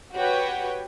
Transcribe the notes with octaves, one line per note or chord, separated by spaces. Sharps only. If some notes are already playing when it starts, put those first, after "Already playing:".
F#4 G4 B4 C#5 G5